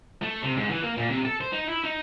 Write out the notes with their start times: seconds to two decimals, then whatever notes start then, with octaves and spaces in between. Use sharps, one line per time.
0.22 A3
0.43 C3
0.57 G#2
0.70 E3
0.83 A#3
0.98 A#2
1.10 C3
1.25 A4
1.41 C5
1.53 D#4
1.68 E4
1.84 D#4